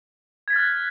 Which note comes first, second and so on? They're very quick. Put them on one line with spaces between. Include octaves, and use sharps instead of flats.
G#6 B6 A6 F6 F#6